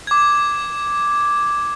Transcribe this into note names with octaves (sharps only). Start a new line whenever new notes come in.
D6 G#6